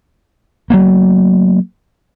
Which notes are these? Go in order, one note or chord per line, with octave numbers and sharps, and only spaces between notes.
F#3 A3 A#3